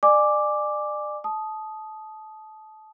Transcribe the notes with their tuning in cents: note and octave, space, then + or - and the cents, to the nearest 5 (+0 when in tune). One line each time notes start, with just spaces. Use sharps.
D5 +35 G#5 +0 D6 +0
A5 -25 D#6 +0